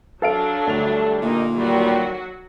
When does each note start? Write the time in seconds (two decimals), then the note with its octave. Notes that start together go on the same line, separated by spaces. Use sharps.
0.22 F#3 D4 A4 F5 D7
0.67 D2 G3 A3 F7
1.22 G2 A#2 A#3 D#4
1.55 D#3 F#3 G3 F#4